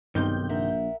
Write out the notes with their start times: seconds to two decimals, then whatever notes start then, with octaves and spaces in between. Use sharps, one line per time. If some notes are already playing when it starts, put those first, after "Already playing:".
0.15 B1 G2 C3 D#3 G6
0.49 A#1 A#4 E5 F#5